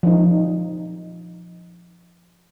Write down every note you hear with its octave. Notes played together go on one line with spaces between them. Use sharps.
F3 D#4